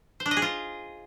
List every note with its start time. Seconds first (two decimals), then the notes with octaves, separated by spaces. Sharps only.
0.20 C5
0.26 D4
0.31 D#5
0.37 G#4
0.42 F4